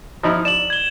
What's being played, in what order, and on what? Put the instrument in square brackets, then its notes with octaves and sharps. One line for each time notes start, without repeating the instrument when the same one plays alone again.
[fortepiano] F3 D#4 E4
[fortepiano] D5 [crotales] E7 F#7
[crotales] G#6 G7